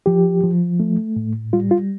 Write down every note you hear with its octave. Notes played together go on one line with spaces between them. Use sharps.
F3 G4
F3
A3
A2
G3 F4
F4